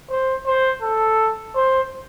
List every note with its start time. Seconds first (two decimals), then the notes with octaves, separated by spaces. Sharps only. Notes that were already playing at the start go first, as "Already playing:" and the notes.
0.10 C5
0.46 C5
0.82 A4
1.56 C5